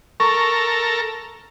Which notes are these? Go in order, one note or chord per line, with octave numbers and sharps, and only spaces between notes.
A4 A#4 A#5 C#6